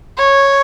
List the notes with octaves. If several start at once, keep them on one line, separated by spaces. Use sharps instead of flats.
C#5